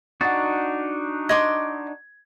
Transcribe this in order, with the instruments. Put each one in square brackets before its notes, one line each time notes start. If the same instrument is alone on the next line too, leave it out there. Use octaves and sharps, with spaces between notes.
[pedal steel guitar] D4 D#4 F#4 [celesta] F#5 A6
[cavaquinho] D#5 C6 D6 [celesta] G#6